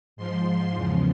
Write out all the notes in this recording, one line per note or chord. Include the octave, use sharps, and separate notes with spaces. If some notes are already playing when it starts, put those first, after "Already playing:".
G#2 F3 C6
E2 C#3 F3